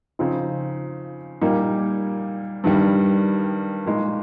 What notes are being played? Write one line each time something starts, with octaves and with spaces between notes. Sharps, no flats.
C#3 F3 C4 D#4
A#2 G3 A#3 D#4
G2 D#3 G3
A#2 G#3 D#4